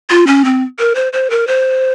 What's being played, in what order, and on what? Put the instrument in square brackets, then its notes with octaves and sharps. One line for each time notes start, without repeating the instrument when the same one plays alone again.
[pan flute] F4
C#4
C4
A#4
C5
C5
A#4
C5